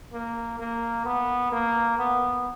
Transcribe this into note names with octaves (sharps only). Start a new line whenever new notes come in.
A#3
A#3
B3
A#3
B3